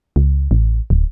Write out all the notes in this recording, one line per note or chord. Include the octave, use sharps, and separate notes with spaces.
C#2
A1
D1